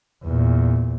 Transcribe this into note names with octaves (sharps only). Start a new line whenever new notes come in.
E2 A#2